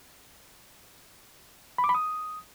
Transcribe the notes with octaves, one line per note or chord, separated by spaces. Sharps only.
B5
D6
B5
D#6